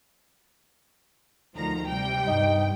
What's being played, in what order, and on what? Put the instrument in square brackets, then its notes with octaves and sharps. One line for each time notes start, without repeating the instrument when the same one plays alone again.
[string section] D2 D#3 F3 [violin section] A#5
[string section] C3 G3 [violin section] G5
[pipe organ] G2 [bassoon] D#4